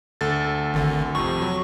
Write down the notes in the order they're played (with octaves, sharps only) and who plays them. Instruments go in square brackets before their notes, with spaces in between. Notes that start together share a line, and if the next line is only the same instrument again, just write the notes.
[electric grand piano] D2 A4 A6
[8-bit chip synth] G#1 D3
[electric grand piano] F2 C3 [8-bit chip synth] C#6
[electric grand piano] F#3